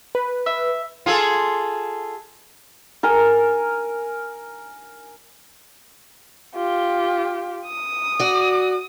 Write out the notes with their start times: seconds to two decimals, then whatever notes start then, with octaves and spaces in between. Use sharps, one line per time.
0.15 B4
0.46 E5
1.06 F4 G#4 A4
3.03 A#4 G#5
6.55 F4 G4
7.66 D#6
8.19 F#4 D5